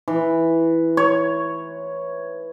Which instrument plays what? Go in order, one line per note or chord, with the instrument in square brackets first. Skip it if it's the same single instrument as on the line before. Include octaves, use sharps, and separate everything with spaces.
[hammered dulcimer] E3
C#5